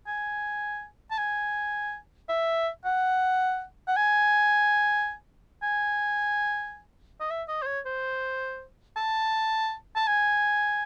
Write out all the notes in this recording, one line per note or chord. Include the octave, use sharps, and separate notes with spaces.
G#5
A5
G#5
E5
F#5
F#5
G#5
G#5
D#5
E5
D#5
C5
C#5
C5
A5
A5
G#5